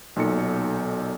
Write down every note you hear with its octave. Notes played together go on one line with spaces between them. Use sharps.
B1 A#2 D#4 A4 C#7